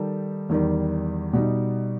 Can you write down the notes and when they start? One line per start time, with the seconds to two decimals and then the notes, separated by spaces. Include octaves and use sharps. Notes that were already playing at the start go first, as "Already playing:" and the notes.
Already playing: D#3 G3 D#4 A4
0.49 E2 D#3 G3
1.33 B2 G3 D#4